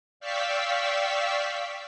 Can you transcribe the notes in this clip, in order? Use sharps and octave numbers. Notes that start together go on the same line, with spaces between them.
D5 F5 G5 C#6 E6 B6